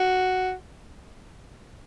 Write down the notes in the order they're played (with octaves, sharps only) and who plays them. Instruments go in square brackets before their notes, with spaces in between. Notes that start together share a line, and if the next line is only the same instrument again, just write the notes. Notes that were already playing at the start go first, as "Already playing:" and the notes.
Already playing: [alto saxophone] F#4